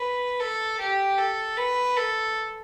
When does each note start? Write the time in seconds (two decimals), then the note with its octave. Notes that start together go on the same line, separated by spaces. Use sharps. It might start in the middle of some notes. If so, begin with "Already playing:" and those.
Already playing: B4
0.40 A4
0.80 G4
1.19 A4
1.58 B4
1.97 A4